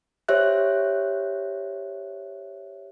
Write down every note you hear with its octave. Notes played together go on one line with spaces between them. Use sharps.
G4 C5 C#5 E5 F#6